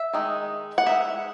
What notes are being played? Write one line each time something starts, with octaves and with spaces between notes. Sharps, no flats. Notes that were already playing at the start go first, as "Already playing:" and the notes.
Already playing: E5
D#3 G#3 D#4
F#5
G#3 D#4 E5